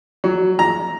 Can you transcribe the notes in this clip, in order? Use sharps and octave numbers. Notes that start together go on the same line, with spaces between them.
F#3
A#5